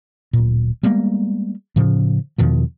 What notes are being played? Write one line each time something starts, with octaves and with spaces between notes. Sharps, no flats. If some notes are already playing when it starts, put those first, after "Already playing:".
D1 A#2
G3 G#3 A#3 B3
A2 C#3 F3 C#4
E2 B2 D#3 F3